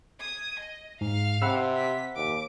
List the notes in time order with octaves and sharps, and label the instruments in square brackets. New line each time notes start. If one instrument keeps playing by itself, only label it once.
[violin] D#6 G#6
D#5
[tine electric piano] G#2 [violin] F5
[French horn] C3 [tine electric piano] F#5 B5 E6
[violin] B6
[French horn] D#2 [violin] D6